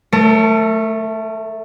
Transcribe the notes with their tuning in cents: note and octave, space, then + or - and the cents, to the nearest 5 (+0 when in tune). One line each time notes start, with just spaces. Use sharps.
A3 +0 A#4 -45